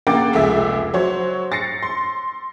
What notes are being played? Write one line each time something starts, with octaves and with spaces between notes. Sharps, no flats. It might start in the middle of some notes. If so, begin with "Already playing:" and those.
C#3 A#3 F#5 G5 D6 A6
F1 C#2 G#3 E5
F#3 C5 C#5
A6 A#6 C7 C#7
C6